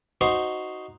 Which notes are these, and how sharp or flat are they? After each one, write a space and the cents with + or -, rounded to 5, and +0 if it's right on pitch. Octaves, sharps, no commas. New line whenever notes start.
D#4 +0 F#4 +0 C5 +0